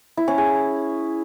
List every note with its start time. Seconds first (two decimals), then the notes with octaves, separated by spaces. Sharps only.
0.17 E4
0.28 C#4
0.38 G#4